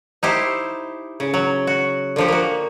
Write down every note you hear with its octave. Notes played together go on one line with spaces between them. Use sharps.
D#4 E4 G4 C5
C#3
F#3
F#4
D3 F3 G4
A#3 F#4